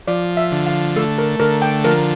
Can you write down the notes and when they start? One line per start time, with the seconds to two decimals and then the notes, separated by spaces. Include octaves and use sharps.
0.08 F3 D5
0.37 E5
0.52 D3
0.67 F5
0.96 A3 A4
1.18 A#4
1.40 D3 A#4
1.62 G5
1.84 F3 A#4